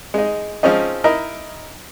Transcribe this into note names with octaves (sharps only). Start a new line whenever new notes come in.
G#3 D#4
F3 G#3 C4 C#4 D#4
D#4 E4 A#4 D#5